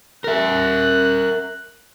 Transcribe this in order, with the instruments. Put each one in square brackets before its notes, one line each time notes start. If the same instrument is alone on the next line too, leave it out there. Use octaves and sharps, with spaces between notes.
[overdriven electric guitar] A#4 E5 [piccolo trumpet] F#6